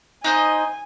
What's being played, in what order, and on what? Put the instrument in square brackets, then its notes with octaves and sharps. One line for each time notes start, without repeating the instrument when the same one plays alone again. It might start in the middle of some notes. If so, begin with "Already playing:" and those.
[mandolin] D#4 C5 D#5 [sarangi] G#5